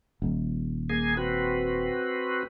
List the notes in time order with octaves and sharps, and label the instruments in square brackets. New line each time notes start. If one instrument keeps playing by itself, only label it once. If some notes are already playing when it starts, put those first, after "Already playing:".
[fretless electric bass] D#1
[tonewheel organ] A#3 G#4 G#5
C4 F#4 B4